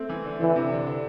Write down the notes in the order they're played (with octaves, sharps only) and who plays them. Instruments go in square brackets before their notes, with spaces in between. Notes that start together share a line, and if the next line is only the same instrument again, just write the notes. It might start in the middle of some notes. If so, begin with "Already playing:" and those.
Already playing: [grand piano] A3 C4
E3
D3
[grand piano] D3 [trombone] E3
[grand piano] C3
D3
D3